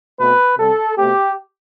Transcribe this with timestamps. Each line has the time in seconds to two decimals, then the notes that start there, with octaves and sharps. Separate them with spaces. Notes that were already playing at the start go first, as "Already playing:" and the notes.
0.19 B2 A3 C4 B4
0.57 C3 G3 C4 A4
0.97 B2 A3 C4 G4